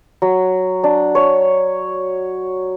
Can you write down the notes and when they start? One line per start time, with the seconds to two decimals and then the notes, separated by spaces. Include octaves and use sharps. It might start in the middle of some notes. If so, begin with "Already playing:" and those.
0.22 F#3
0.84 D4
1.15 C#5